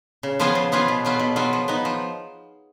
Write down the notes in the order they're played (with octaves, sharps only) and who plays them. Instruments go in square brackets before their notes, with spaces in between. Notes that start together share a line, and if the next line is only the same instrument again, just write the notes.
[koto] C#3
F3 B3 F4 G#4
C#3
F3 B3 F4 G#4
B2
F#3 B3 F4
B2
F#3 B3 F4
F3
B3 D#4
F3